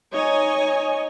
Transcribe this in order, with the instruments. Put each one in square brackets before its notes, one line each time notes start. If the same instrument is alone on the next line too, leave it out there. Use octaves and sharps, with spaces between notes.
[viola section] D#4 C#5 D#5 G#5